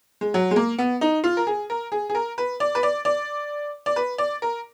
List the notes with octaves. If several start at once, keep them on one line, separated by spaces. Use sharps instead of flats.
G#3
F#3
G#3
A#3
B3
D#4
F4
A#4
G#4
A#4
G#4
G#4
A#4
B4
D5
B4
D5
D5
D5
B4
D5
A#4